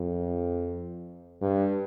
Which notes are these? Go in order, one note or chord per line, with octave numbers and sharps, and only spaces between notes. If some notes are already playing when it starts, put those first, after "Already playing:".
Already playing: F2
G2